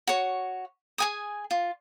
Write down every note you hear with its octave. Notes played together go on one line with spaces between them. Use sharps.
F#4 C#5
G#4 G#5 D#6
F4